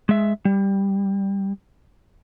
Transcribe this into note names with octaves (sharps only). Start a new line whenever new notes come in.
G#3 E5
G3